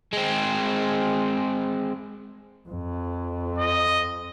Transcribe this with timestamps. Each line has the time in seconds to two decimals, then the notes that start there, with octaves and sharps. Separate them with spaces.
0.13 G#3 C4
2.69 F2
3.58 D#5